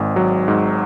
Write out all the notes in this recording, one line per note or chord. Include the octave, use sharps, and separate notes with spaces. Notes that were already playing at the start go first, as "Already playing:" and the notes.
Already playing: G#1 G#2
F#3
G#2